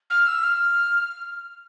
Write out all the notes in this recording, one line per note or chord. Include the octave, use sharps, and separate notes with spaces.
F6
E6
F6